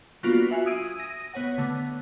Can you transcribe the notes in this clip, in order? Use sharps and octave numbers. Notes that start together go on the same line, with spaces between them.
F#3 A#3 B3 D4 F4 F#4
F4 F#4 E5 G#5
D#6 E6 G#6 D7 D#7
A#6 D#7
B3 C#5 F#5
D3 A3 B3